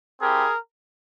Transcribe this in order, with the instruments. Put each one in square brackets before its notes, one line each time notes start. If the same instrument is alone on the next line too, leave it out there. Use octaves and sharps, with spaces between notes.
[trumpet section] C4 E4 G4 G#4 A#4